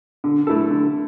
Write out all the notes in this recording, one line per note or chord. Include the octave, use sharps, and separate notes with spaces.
D3
A3 E4 A4
D3